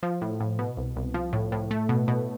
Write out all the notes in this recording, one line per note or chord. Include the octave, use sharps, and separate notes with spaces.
F3
A2
A2
B2
C2
C2
F3
A2
A2
A3
B2
B2